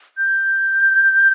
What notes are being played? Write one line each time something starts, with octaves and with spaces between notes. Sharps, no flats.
G6